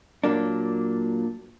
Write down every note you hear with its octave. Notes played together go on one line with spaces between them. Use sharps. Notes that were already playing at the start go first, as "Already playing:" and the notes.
A#2 F#3 A#3 D4